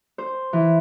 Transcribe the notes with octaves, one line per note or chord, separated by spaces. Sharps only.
C5
E3